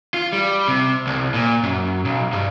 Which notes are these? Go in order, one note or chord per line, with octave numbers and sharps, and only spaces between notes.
F4
G3
C3
C2
A#2
F#2
B1
G2